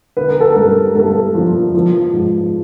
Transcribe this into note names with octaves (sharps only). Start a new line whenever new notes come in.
D3 B4
A#4
A4
G2 A#4
G2 A4
F3
F3
G#2